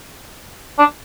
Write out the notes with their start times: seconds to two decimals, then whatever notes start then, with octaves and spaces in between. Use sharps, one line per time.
0.79 D4